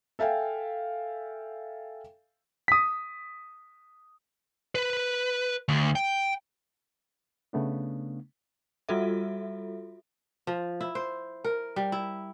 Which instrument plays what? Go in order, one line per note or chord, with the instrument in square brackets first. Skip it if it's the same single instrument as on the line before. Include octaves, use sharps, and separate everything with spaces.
[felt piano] A4 E5 F5 G5 G#5
[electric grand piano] D#6 B6
[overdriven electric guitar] B4
D2
G5
[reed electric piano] C#3 A3 B3 D4
[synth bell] G3 F4 F#4 A4 E5
[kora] F3
E4
C5
A#4
G3
E4